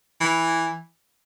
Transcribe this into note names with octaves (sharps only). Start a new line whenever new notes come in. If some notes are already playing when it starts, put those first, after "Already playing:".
E3